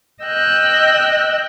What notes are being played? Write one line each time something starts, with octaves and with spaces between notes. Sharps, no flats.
D#5 G5 E6 F#6